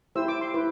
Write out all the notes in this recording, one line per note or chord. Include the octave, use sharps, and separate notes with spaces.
E4 G4 C5 E6
D6
C6
E4 B4